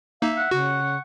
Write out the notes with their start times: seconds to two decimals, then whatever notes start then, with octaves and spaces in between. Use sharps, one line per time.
0.22 A#3 D#4 E5 F5
0.37 F#5
0.51 C#3 F#4 C#6